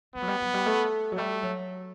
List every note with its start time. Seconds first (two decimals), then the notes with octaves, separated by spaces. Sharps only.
0.15 A3 B3
0.22 F#3
0.28 G3
0.41 F#3
0.54 G3
0.66 A3
1.12 F#3
1.17 G3 A3
1.43 F#3